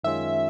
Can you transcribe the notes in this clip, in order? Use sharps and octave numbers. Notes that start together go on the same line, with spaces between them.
F#2 D#3 G#3 C#4 F4 E5